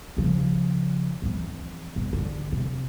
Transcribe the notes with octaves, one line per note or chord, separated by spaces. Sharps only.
C#3 F3
F2 E3
E2 D3
D3
C3